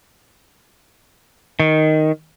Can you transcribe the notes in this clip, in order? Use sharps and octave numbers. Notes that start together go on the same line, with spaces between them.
D#3